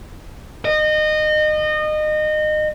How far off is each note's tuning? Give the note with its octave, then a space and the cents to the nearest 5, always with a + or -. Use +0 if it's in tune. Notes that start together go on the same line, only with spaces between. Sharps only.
D#5 -25